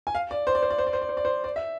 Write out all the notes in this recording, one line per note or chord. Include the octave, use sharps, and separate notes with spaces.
G#5
F5
D5
C5
D5
C5
D5
C5
D5
C5
D5
C5
D5
C5
D5
E5